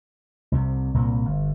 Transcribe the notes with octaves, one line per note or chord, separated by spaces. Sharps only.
C2 C3
C2 A#2 A#3
G1